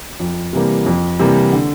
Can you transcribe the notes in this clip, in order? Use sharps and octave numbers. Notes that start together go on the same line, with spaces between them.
F2
C3 E3 G3 A#3
F2
C3 E3 G3 A#3
D3